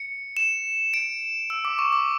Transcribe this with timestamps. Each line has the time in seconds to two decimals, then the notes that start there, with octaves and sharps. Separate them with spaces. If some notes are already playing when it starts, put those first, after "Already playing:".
Already playing: C#7
0.37 E7
0.94 D7
1.50 E6
1.65 D6
1.79 C#6
1.93 D6